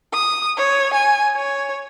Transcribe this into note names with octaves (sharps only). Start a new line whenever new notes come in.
D#6
C#5
G#5
C#5